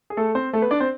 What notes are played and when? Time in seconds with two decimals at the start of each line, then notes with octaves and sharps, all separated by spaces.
0.10 G#4
0.17 A3 A4
0.35 C4 C5
0.53 A3 A4
0.62 B3 B4
0.71 D4 D5
0.80 C4 C5